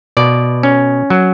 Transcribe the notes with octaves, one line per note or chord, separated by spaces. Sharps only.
B2 D5
C#4
F#3